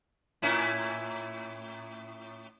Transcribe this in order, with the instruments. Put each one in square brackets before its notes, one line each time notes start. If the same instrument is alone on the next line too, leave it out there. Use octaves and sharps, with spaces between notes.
[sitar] A2 C#4 E4